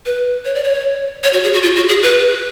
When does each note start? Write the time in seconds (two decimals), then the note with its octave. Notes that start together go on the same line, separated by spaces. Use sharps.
0.06 B4
0.45 C#5
0.55 D5
0.64 C#5
1.24 C#5
1.33 F#4
1.43 G#4
1.53 F#4
1.63 F4
1.76 F#4
1.89 G#4
2.03 B4